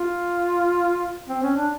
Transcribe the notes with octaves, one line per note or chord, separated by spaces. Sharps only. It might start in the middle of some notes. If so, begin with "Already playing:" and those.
Already playing: F4
C4
C#4
D4